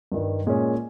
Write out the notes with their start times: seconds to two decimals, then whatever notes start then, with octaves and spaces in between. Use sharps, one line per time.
0.12 G2 D#3 G3
0.46 A#2 G#3 C#4